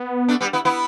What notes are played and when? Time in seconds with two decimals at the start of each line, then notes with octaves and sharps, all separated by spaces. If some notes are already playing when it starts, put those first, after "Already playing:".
Already playing: B3
0.28 A3 D4
0.41 G3 B3
0.53 B3 E4
0.65 B3 E4